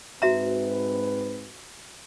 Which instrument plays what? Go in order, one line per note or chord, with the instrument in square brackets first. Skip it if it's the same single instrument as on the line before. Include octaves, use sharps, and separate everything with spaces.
[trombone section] G#2 C4 B4 [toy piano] F#4 E5 A#5